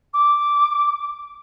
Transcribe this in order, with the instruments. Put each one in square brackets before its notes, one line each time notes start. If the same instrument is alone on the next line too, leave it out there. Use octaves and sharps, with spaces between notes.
[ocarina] D6